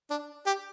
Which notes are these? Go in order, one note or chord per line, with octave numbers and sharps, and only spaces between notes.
D4
G4